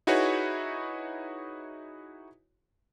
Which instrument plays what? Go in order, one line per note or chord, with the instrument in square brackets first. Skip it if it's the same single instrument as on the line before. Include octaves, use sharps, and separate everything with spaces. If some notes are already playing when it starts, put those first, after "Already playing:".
[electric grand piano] D#4 E4 F#4 G#4 B4 C#5